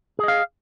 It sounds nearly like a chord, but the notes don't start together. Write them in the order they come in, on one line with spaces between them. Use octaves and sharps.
G#4 D#5 F5